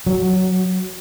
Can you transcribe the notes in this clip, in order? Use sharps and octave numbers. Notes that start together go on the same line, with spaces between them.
F#3